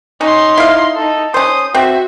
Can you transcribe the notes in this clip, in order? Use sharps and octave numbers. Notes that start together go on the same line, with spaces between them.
C#4 D#4 C6
E4 F5
D#4 A4
C#4 C5 D#6
C4 F#4 E5